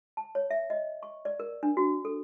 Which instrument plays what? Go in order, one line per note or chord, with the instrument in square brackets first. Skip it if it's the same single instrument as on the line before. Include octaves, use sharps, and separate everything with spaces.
[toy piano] A5
C#5
E5
D#5
C#6
D5
A#4
D4
F#4
A4